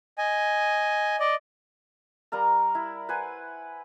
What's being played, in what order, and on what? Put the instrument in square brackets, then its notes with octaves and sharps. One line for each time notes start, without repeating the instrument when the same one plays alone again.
[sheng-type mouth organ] D#5 G#5
D5 D#5
[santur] G3 A#4 F5 A#5
E4
B4 C5 F#5 G#5